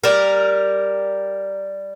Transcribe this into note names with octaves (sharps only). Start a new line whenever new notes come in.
G3 A#4